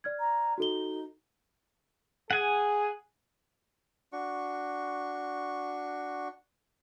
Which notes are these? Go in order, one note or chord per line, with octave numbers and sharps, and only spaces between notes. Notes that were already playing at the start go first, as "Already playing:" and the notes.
D5 F6 G#6
A#5
D#4 F#4 A4 G7
G#4 F#5 G#5
D4 F#4 C#6